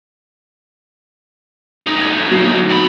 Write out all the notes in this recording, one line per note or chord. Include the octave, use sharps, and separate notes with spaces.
D2 D#4
G#6
B2 F#3 C7
F2 B5